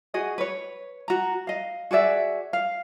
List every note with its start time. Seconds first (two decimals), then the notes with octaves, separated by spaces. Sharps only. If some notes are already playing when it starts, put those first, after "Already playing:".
0.14 F#4 G#4 D#5
0.38 B4 C#5
1.08 F#4 A#5
1.47 D#5 F5
1.91 F#4 G#4 D5 E5
2.53 F5